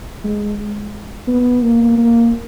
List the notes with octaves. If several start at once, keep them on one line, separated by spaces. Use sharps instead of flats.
G#3
B3
A#3
A#3